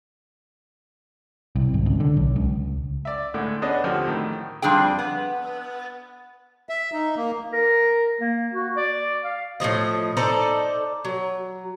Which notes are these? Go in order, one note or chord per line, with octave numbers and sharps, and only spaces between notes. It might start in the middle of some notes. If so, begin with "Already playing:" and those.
C2
G#1
C#2
D3
B1
C#2
D5 E5
A2 D3 G#3
B3 C#4 D4 G#4 D#5
D3 F3 C4 F#4 G4
A2 D#3
F2 G3 D4 G#4 G5
B3
E5
D#4
A#3
A#4
A#3
F#4
D5
F5
A2 C#3 F3 D#5
D#4 A4 C5 D5
F#3